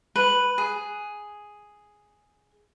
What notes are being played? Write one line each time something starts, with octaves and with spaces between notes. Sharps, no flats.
B4
G#4